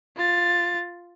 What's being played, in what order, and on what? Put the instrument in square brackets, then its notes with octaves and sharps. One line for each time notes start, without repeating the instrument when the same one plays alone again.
[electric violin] F4 A6